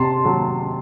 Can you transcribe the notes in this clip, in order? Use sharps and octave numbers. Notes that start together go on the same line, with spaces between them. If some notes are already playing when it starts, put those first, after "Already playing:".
Already playing: C3 A5 C6
F#3